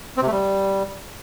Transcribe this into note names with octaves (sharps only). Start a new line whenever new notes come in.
C4
C3
A3
G3